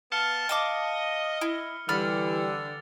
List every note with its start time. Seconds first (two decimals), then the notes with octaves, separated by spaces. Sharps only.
0.12 B3 F5 A5 F6 C#7 G7
0.49 D#5 F5 A5 D6
1.41 E4
1.89 D3 E3 G3 B5 F6 A6 F7